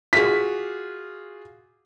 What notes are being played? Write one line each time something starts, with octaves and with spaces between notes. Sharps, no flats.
F4 F#4 G#4 B6